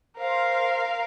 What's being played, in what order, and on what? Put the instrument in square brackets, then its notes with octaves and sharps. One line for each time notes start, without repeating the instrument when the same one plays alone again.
[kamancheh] A#4 F5 [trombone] C5